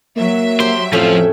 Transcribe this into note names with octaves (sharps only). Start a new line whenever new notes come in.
F#3 A#3 E5
G4 C5 C6
F2 A2 F3 A3 C#4 F4